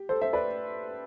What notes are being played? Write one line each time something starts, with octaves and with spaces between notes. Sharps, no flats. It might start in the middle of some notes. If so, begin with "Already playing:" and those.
Already playing: G4
A4 C5
C5 E5
B4 D5